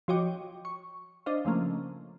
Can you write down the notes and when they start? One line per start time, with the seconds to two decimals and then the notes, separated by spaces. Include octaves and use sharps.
0.08 F3 F#4 C#5 D#5 G5 D6
0.65 C#6
1.26 D4 C5 D#5 F5
1.45 C#3 F3 A3 A#3 C#4